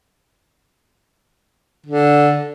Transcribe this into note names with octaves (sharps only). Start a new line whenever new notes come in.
D3